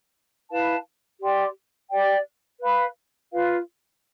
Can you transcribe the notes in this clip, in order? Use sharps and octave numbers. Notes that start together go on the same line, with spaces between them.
E4 B4 F5 A5
G4 D5 G5 C6
G4 D5 G5
B4 F5 B5
F4 B4 F5